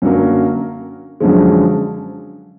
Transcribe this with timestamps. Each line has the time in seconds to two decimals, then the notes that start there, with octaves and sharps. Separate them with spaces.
0.02 F#2 D3 F#3 A#3
1.20 F#2 D3 F3 G#3